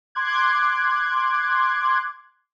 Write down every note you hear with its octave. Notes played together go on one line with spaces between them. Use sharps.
C6 D6 F#6 G#6